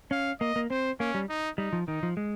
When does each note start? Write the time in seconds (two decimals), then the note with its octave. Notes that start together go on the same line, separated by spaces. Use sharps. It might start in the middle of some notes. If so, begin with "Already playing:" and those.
0.11 C#4 F5
0.40 A#3 D#5
0.56 A#3
0.70 C4 C5
1.00 A#3 C#4
1.15 G3
1.29 D#4
1.58 G3 D#4
1.73 F3
1.88 D#3 D#4
2.03 F3
2.17 G#3